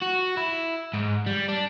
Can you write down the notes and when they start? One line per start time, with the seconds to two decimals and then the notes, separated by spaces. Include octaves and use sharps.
0.02 F#4
0.37 E4
0.93 G#2
1.26 G3
1.48 D4